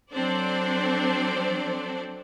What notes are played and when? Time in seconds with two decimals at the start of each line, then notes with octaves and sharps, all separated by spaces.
0.12 F#3 C4 D4 A4 C5 D5